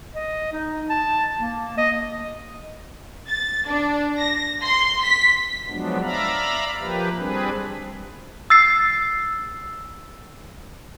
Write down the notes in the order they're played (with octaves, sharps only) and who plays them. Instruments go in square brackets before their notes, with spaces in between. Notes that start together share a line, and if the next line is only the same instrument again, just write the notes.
[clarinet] D#5
D#4
A5
A#3
D#5
[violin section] A6
D4
A#6
C6
B6
[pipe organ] F3 F#3 G#3 B3 D4
D5 E5 F5 A#5 B5
F3 A#3 G4 B4
G3 C4 D4 G#4 B4
[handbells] E6 A6 C7